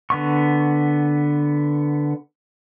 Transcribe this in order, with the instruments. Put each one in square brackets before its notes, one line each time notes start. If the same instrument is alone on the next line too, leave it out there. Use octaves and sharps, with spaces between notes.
[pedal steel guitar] D3 B3 C#6